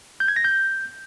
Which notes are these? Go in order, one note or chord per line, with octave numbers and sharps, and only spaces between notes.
G6
G#6
A#6
G6